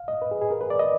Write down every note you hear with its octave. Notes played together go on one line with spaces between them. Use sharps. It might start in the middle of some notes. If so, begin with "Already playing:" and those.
Already playing: F5
D#5
B4
G#4
G#4
A#4
B4
D5
D#5